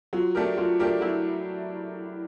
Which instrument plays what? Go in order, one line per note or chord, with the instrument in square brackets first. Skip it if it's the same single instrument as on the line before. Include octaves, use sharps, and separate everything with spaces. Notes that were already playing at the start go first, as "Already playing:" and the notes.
[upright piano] F#3 [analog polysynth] F4
[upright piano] A3 D4 G4 A#4
[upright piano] F#3 [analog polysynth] F4
[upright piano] A3 D4 G4 A#4
[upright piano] F#3 [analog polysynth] E4